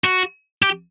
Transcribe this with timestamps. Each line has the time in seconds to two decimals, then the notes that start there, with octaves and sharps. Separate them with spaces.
0.04 F#4
0.62 G4